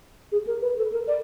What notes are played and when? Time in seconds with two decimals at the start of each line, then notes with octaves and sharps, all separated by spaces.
0.32 G#4
0.47 A#4
0.62 B4
0.78 A4
0.92 A#4
1.08 D5